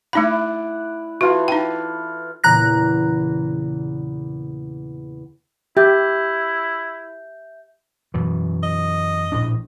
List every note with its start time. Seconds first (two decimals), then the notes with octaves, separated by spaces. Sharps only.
0.13 A3 D#4 E4 D5 F#5 B5
1.21 E3 F4 F#4 A4
1.48 D#4 G5
2.44 E2 A#2 C#3 A#5 F#6 A#6
5.77 E4 G4 E5 G6
8.14 F#2 B2 E3
8.63 D#5
9.32 A#1 A2 D4